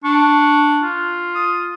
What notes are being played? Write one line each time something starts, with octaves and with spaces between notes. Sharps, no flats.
D4 C#6
F4
D#6